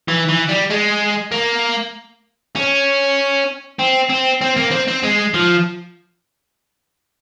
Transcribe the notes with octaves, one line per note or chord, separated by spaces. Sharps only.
E3
E3
G3
G#3
A#3
C#4
C4
C4
C4
A#3
C4
C4
G#3
F3